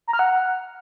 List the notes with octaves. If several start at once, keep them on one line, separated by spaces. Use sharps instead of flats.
A#5
F6
F#5